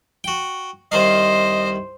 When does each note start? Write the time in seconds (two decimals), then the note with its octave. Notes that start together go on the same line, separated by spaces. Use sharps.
0.24 F#4 G5
0.92 C2 D#3 C5 D#5 F5